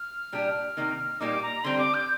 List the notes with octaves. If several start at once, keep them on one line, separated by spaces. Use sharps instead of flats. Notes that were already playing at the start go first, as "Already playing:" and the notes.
Already playing: F6
A#2 G3 D4 G4
C3 D#3 A#3 D#4
A#2 G3 A#3 D#4 D6
A#5
D3 G3 C4 C6
D6
G6